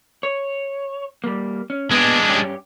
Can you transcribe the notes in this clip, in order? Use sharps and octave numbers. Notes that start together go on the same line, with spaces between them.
C#5
G3 A#3
C#4
A#2 G#3 B3 D4
G2 C#4 G4